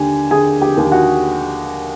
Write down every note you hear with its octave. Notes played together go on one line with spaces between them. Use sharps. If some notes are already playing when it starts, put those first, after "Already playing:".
Already playing: D#2 D3 G4 G#5
D3 G#4 G#5
G4 G5
D#2
F#4 F#5